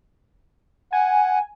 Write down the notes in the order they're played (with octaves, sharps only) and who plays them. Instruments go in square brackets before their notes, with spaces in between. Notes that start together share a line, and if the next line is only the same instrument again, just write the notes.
[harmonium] F#5 [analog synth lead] G#5